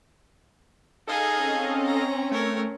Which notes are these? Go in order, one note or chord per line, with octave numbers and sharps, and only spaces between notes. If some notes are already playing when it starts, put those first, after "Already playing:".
D#4 G#4 A4 D#5 F5
C4 C#4
A#5
A3 A#4 C#5